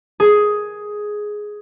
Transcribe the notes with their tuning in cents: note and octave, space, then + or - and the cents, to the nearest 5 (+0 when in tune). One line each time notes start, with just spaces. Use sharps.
G#4 +5